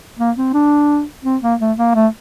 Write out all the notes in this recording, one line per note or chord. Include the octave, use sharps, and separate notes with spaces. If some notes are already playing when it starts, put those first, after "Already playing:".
A#3
C4
D4
C4
A#3
A3
A#3
A3